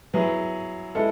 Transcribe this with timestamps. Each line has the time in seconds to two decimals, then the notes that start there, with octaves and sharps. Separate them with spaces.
0.13 F#3 B3 E4 G#4
0.95 G#3 B3 E4 A4